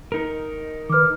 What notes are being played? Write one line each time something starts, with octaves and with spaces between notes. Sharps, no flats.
D#4 A#4
D#3 B4 D6 F6